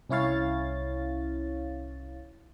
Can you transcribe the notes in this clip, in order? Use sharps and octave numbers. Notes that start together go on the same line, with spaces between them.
C2 C#4 E4 C#5 F5 A6